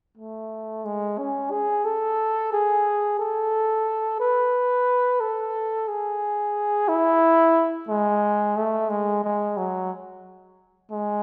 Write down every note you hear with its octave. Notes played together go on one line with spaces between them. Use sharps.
A3
G#3
C#4
G#4
A4
G#4
A4
B4
A4
G#4
E4
G#3
A3
G#3
G#3
F#3
G#3